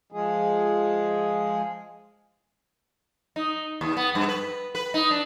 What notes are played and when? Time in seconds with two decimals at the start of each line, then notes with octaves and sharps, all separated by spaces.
0.12 F3 G#3 G#4
3.36 D#4
3.81 D#2
3.97 B3
4.15 G2
4.28 B4
4.75 B4
4.94 D#4
5.11 D4